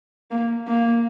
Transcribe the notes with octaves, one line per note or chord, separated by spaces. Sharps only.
A#3
A#3